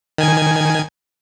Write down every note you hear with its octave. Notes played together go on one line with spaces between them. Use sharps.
D#3 G#5 G#6